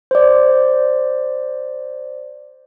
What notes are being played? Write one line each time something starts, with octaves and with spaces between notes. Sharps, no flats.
C5 D5